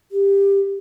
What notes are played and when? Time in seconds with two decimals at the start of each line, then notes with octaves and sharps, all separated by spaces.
0.11 G4